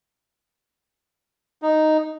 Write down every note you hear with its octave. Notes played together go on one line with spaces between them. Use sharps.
D#4